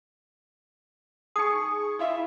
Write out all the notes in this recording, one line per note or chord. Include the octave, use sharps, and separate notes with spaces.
D#4 G#4 C#6 D#6
E4 F4 E5